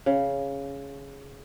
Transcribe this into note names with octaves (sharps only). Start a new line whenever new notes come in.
C#3